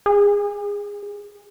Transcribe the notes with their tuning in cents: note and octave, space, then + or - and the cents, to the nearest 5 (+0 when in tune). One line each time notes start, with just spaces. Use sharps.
G#4 -20